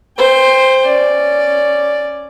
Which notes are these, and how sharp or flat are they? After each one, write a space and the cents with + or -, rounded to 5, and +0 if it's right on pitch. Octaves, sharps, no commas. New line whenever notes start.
C5 +0 G5 +30
C#4 +0 D5 +0